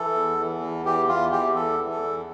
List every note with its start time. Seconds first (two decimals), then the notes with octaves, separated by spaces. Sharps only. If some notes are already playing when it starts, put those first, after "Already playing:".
Already playing: E3 A4
0.14 E2
0.38 E3
0.61 E2
0.86 E3 G4
1.08 E2 F4
1.32 E3 G4
1.55 E2 A4
1.79 E3
1.91 A4
2.02 E2